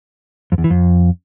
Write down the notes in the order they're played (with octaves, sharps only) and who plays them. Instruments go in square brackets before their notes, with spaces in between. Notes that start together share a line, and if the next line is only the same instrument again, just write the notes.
[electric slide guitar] F2
E2
E3
F2